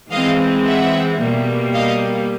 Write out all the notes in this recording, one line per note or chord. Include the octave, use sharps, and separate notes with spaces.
E3 G#3 C4 D#5 F5
E5 F#5
B2 G3 A#3
D#5 F5